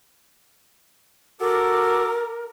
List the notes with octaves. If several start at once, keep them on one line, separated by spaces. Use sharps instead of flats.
F#4 A4 A#4 D6